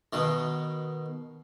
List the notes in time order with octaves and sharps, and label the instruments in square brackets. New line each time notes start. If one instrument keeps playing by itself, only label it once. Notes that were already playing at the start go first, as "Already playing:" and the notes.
[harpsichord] B2 D#3